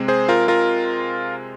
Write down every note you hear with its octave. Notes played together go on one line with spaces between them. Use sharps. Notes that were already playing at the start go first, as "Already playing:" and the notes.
Already playing: C3 G#3 C4
G#4 C5
F4 A#4
F4 A#4